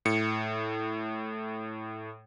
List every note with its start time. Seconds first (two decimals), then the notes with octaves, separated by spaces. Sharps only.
0.05 A2 C#7